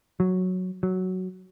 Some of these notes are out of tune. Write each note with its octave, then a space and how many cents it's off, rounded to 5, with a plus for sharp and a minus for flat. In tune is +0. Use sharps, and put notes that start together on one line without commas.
F#3 -5
F#3 +5